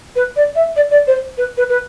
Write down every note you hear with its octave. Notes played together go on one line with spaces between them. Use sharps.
B4
D5
E5
D5
D5
C5
B4
B4
B4